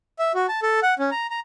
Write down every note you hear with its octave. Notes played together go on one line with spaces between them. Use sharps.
E5
F#4
A5
A4
F#5
C#4
A#5
A#5